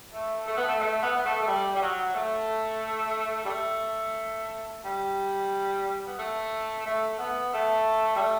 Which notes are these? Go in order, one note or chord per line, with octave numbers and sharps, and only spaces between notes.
A3
A3
B3
A3
A3
B3
B3
A3
A3
G3
G3
F#3
A3
G3
A3
G3
B3
A3
A3
B3
A3
G3
A3